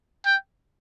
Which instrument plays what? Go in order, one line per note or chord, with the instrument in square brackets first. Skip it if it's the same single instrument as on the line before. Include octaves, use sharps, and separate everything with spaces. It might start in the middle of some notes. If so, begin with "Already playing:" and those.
[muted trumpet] G5